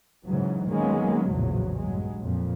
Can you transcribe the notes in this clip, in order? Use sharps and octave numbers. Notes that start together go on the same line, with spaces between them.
G#2 C#3 E3 F#3
D#3 F#3 G#3 A#3 B3 C#4
A#1 E2 A2 C#3 F3 F#3
G2 F#3 G#3
F2 A#2